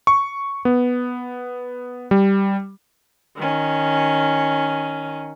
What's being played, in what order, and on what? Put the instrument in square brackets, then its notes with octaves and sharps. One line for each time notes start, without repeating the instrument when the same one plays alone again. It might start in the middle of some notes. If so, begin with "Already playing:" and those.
[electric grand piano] C#6
B3
G3
[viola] D#3 C#4